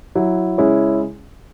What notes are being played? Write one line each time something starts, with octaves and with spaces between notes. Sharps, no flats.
F#3 E4
C#3 G#3 C#4 E4